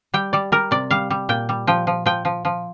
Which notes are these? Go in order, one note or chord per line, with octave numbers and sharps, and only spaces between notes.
G3 G5
G3 D5
G3 A#4
C3 D5
G3 F5
G3
A#2 G5
G3
F3 G5
F3
F3 G5
F3
F3